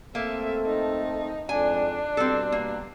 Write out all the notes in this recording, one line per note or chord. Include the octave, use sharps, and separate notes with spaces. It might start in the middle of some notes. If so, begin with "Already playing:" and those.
A3 A#3 C4 A4 E5
D#4
F2 G#2 D4 G#5
B2 G3 C4 A4
A#3